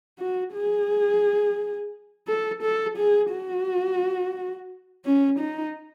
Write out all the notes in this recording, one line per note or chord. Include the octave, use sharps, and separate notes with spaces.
F#4
G#4
A4
A4
G#4
F#4
C#4
D#4